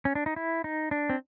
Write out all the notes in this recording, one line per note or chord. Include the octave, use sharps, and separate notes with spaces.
C#4
D4
D#4
E4
D#4
D4
C4